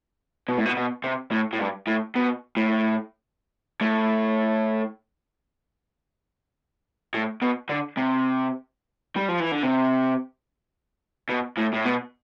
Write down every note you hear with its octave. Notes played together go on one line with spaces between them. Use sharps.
B2
A2
B2
B2
C3
A2
A2
G2
A2
B2
A2
A2
A2
B2
D3
C3
G3
F3
E3
D3
C3
B2
A2
A2
B2